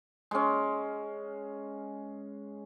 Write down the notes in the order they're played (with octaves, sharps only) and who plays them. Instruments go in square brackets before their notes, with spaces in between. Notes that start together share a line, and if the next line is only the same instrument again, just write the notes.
[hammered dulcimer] G#3 C#4